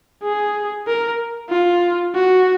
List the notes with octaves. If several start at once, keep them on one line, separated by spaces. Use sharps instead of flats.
G#4
A#4
F4
F#4